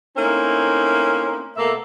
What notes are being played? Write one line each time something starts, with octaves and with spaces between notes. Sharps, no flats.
A3 A#3 C4 C#4 D#4 E4
B2 A3 A#3 E5